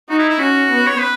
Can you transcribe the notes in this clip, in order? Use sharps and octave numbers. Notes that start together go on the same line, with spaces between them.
D#4 F#4
E4
E4
C#4 F#4
B3
C#5
B4